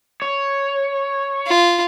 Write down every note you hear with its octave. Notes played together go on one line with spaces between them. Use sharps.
C#5
F4